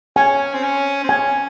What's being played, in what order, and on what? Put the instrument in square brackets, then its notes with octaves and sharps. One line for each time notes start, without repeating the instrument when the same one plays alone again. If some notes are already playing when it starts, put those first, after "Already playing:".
[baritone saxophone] C#4 [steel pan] G#5
[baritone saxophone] C4
C#4
C4
[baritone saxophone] C#4 [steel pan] G#5